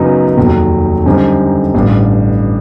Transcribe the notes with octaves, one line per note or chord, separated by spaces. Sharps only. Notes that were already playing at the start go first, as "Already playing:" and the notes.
Already playing: F#2 C#3 F#3 B3 D#4
F1 D#2 D#3 F#3
F#2 D3 G3 C4 D#4
A1 G2 D3